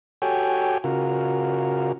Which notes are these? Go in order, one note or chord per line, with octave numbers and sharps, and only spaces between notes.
F#4 G4 A4 C#5 G5 G#5
C#3 F4 F#4 A#4